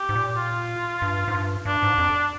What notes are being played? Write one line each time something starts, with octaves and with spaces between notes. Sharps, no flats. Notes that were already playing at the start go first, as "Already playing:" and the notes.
Already playing: G4
G#2
A#2
F4
G2
G#2
G2
G2 D4
G#2
F2